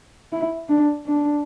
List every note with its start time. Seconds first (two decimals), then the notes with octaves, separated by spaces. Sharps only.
0.32 E4
0.69 D4
1.07 D4